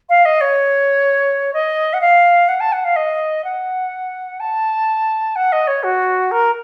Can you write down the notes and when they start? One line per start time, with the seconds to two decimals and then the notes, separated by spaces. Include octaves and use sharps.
0.09 F5
0.25 D#5
0.40 C#5
1.53 D#5
1.93 F#5
2.00 F5
2.48 F#5
2.60 A5
2.72 F#5
2.84 F5
2.95 D#5
3.44 F#5
4.39 A5
5.35 F#5
5.52 D#5
5.67 C#5
5.83 F#4
6.31 A#4